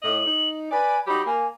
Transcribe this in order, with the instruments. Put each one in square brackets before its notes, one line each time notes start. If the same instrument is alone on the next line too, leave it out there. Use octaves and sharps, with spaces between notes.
[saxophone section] A2 D#5 [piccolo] F#7
[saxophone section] D#4
[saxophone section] B4 D5 [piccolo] G#5
[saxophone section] F#3 D#4 G4 [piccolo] B5
[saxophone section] A#3 [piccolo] G#5